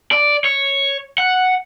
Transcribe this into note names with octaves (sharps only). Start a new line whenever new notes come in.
D5
C#5
F#5